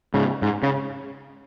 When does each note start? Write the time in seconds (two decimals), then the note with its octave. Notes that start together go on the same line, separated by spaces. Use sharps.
0.14 G#2 C#3
0.42 G#2
0.63 C#3